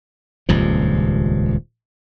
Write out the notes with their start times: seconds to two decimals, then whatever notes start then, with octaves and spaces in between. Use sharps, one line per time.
0.49 D#1 C#2 G2 F3